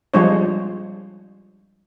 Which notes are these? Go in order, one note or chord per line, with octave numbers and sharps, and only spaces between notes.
F3 G3 G#3 D4 C5 C#5